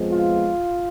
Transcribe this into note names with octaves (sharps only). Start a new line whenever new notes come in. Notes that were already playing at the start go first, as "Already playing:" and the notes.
Already playing: F2 F3 G#3 B3
F4